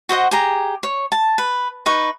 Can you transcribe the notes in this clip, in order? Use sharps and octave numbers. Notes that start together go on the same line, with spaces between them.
F#4 C5 D#5 F#5
G4 G#4 A#5
C#5
A5
B4
D#4 B4 C#6